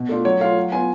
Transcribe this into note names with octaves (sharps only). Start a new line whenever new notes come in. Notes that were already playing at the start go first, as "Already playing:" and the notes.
Already playing: B2
A3 D4 F4
F#3 C#5
A3 F4 F5
F#3
B3 F4 G#5